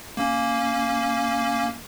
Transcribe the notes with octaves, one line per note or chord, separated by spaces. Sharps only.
A#3 C#4